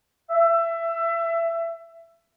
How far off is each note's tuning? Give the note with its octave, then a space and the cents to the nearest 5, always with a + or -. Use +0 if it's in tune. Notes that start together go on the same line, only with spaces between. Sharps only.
E5 +20